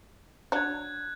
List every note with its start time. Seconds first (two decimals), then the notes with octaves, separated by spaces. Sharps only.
0.52 F#3 D4 F#6 G#6